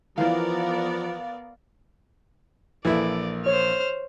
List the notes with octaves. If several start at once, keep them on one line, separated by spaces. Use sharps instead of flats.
E3 F3 B3 A#4 D5 F5
A#1 E3 A#3 E4 A4 D5
C5 C#5 F6